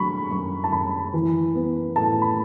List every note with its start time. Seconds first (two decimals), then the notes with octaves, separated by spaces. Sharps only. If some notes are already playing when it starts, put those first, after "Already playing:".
Already playing: D3 F#3 B5 C#6
0.31 F#2 C#6
0.64 A5
0.72 F#2 B5
1.14 E3
1.55 B3
1.96 A2 A5
2.22 B5